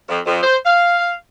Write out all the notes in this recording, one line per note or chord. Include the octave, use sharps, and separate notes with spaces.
F2
F2
C5
F5